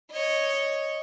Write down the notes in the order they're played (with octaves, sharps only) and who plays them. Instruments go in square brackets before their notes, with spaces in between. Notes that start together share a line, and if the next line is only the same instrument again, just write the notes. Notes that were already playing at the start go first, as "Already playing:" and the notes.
[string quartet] C#5 D#5